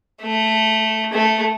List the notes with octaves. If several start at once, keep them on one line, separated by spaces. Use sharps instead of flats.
A3
A3